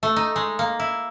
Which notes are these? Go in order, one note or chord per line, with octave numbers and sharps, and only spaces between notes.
A3
D#4
G#3
A#3
E4